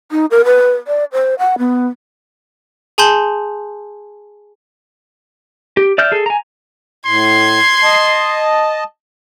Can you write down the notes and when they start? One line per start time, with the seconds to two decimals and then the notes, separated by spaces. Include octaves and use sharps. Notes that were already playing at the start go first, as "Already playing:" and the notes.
0.11 D#4
0.31 A#4
0.45 B4
0.87 D5
1.12 C5
1.39 F#5
1.58 B3
2.98 G#4 G#5 A5 C6 G6 F#7
5.77 G4
5.98 D5 E5 F6 G6
6.12 G#4 A4
6.26 G#5 A#5
7.07 A2 C6 G#6 C7
7.83 D#5 A5